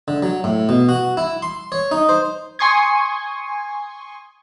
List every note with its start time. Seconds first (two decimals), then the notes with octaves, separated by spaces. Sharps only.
0.08 D3
0.22 F#3
0.44 A2
0.69 B2
0.89 F#4
1.17 E4
1.42 C6
1.72 C#5
1.91 D#4
2.09 C5
2.59 G#5 C6 C#6 D#6 G#6